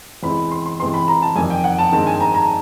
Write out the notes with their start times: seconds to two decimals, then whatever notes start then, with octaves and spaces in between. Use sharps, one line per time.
0.23 E2 C3 E3 G#3 C4 B5
0.51 C6
0.66 C6
0.80 C3 E3 G#3 B3 C6
0.94 B5
1.08 A#5
1.22 A5
1.36 F2 C3 D#3 G3 G#5
1.50 G5
1.64 F#5
1.79 A5
1.92 G2 D#3 G#3 C4 A5
2.07 G#5
2.20 A#5
2.35 A#5